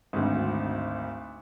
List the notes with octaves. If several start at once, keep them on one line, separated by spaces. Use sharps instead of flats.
G#1 D2